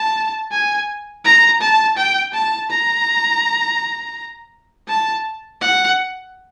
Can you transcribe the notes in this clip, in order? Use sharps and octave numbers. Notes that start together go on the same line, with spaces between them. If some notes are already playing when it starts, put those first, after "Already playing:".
Already playing: A5
G#5
A#5
A5
G5
A5
A#5
A5
F#5